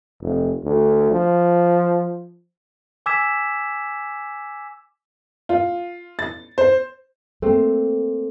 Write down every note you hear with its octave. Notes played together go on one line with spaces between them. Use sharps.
F1
D2
F3
G#5 D6 E6 G#6 B6 E7
F4
A6
C5
A3 A#3 C4